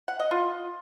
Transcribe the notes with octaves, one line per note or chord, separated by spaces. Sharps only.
F#5
D#5
F4